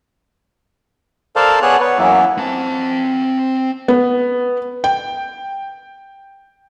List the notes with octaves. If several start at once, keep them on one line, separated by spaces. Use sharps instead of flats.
A4 A#4 C5 D5 F5 A5
B3 G#4 C#5 D5 A5 F#6
B3 B4 C#5
F#2 E3 F#3 A#3 B3 E4
C4 A5
B3
G5